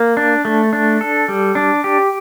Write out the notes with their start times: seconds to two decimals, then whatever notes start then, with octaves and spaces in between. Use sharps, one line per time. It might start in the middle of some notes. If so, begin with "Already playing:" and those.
Already playing: A#3
0.17 D4
0.45 A3
0.73 D4
1.01 A4
1.28 G3
1.55 D4
1.84 G4